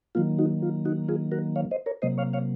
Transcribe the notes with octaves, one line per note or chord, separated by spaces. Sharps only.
D#3 F#3 A#3 F4
D#4 F#4
F4
D#4 F#4
F4 G#4
F#4 A#4
C#5 F5
C5 D#5
A#4 C#5
C3 F#3 A#3 C5 D#5
C#5 F5
C#5 F5